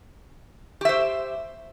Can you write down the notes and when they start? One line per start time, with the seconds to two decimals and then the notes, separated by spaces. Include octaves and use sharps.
0.81 G4
0.85 E5
0.89 C5